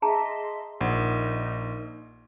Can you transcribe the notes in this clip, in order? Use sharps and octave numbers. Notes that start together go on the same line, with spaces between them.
G#4 D#5 E5 A5 A#5 C6
A#1 D#4 A#4 F#5